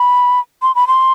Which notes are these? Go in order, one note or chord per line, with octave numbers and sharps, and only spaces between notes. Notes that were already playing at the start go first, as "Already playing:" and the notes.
Already playing: B5
C6
B5
C6